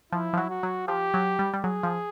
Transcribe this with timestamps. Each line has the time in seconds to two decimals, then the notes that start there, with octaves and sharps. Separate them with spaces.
0.12 F3 E4
0.33 F3
0.37 F#3
0.50 F#4
0.63 F#3
0.88 F3 G4
1.14 F#3
1.39 G3
1.54 G3
1.64 F#3 G#4
1.83 F3